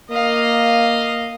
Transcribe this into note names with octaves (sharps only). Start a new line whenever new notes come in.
A#3 D#5 F5